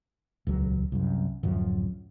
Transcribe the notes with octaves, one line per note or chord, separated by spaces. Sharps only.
D#1 C#2 F#3
C2 F#2
D1 F#2 F3